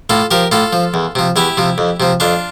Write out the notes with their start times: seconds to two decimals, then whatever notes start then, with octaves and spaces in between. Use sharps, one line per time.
0.10 A2 F4 A4
0.31 F3 G4 A#4
0.52 A2 F4 A4
0.73 F3
0.94 E2
1.15 C3 F3
1.36 E2 E4 G4
1.57 C3 F3
1.78 F2
2.00 C3 F3
2.20 F2 D4 F4